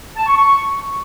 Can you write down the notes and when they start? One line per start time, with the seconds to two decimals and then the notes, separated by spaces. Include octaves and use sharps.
0.17 A5
0.27 C#6
0.37 C#6